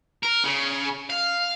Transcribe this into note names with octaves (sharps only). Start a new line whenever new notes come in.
A#4
C#3
F5